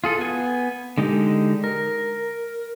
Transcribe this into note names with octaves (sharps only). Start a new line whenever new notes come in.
F4 G#4 A4
B3 G#5
D3 G#3 D#4 G4
A#4